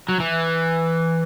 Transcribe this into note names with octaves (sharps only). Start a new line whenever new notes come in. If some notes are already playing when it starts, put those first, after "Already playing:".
F#3
E3